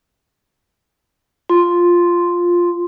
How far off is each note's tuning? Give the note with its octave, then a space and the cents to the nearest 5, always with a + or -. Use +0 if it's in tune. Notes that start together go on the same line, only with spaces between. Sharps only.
F4 +0 C6 +0